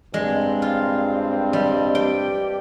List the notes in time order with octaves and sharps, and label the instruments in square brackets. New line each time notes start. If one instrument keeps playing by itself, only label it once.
[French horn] G2 [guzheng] G#3 [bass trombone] C4 [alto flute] D5
[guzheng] F4 [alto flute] D5
[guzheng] G3 [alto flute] D#5
[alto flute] G4 [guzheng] G5